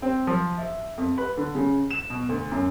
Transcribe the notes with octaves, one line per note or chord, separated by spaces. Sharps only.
C4
F3
E5
F2
B4
D3
C#3
E7
B2
D2
F#2